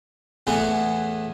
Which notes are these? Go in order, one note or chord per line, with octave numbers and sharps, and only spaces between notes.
E2 A2 E3 B3